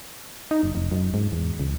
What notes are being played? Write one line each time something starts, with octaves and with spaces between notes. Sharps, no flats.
D#4
F#1
F1
F#2
G#2
E2
C#2